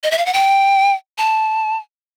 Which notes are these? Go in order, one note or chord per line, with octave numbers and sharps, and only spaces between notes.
D#5
E5
F5
F#5
G5
A5